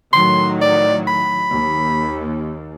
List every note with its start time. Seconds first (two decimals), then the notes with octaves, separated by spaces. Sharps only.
0.13 A2 D#3 F#3 C6
0.61 D5
1.07 B5
1.50 D#2